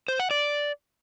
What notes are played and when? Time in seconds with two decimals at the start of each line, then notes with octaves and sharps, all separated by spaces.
0.08 C5
0.20 F#5
0.31 D5